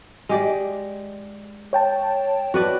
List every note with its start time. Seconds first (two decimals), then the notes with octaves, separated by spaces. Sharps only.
0.29 G#3 G4 D5
1.73 C#5 G5 A5
2.54 F#4 B4 D5